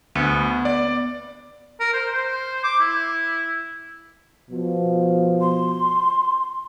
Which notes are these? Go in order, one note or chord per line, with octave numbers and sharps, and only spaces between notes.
D2 B3
D5
A#4
C5
C5
D6
E4
B2 F3
C6